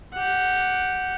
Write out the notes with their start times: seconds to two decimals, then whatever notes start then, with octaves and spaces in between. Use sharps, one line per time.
0.13 G4 F#5